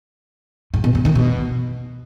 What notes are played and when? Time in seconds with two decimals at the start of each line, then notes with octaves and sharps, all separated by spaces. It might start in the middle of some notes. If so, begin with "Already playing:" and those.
0.74 G#2
0.84 B2
0.95 C#3
1.05 D#3
1.15 B2